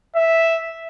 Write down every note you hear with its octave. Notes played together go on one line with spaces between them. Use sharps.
E5